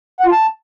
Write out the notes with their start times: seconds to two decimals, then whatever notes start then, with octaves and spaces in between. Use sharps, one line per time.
0.20 F#5
0.26 F4
0.32 A5